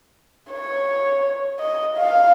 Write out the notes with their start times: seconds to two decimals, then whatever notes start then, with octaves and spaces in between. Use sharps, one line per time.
0.51 C#5
1.60 D#5
1.97 F5